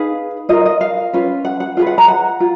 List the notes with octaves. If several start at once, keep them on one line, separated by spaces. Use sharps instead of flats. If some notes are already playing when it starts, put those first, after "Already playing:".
Already playing: D#4 G#4 B4 F5
F4 A#4 D#5
D#5
F5
C#4 F4 B4
F#5
F#5
F4 G#4 B4 F5
F#5
A#5
F#5
F4